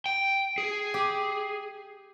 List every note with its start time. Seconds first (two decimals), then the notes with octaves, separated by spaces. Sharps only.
0.06 G5
0.58 G#4
0.94 G4